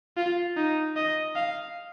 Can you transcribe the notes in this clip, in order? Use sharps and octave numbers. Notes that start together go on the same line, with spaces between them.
F4
D#4
D#5
F5